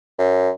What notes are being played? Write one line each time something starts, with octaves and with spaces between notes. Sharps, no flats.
F#2